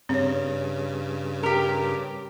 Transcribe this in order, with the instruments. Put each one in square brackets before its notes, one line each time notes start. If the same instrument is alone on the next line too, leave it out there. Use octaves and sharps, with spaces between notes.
[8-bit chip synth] G2 C#3 [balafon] C4 C#5
[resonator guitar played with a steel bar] G4 A#4